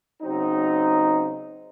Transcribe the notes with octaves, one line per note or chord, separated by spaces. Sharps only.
C#3 F#3 C4 D#4